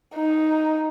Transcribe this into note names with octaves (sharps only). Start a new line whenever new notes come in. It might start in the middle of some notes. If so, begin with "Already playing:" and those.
D#4